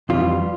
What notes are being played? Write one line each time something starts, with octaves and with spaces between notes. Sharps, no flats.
F2 E3 G3 F4